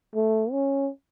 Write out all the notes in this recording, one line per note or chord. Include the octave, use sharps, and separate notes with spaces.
A3
C#4